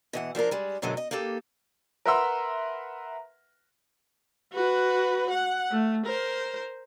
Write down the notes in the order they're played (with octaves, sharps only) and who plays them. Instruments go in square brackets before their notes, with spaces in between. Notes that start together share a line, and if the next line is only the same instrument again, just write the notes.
[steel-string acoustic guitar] B2 E3 F#5
F3 D4 F4 A#4
G3 G#3
F#2 B2 D3 F#3 G#3
D#5
A#3 D#4 G4 A4
[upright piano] A#4 B4 E5 F#5 C6 E6
[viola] F#4 B4
F#5
A3
A#4 C5